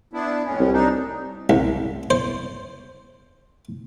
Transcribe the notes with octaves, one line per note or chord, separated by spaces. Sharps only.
B3 D4 E4
F2 A2 C#4
C2
D4 D#4
C2
C5